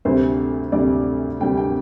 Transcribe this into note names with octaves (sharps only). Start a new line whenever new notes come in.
D2 C3 G3 C5
D2 C3 G3 D5
D2 C3 G3 G5
G5